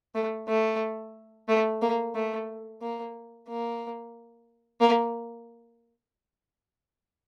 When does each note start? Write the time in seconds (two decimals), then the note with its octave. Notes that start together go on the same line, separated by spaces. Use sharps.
0.15 A3
0.48 A3
1.48 A3
1.82 A#3
2.15 A3
2.82 A#3
3.48 A#3
4.81 A#3